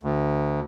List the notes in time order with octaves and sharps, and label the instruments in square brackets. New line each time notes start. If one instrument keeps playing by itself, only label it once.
[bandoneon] D2